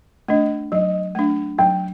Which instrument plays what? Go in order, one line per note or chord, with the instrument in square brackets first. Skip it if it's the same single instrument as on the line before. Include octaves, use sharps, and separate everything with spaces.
[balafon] A3 D4 [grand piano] D#5
[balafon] F#3 [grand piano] D#5
[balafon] A3 D4
[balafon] F#3 [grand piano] G5